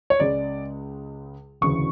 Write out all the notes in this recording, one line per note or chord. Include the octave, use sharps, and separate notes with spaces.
C#5
C#2 C#3 G#3 D5
E1 D2 C#3 E3 C#6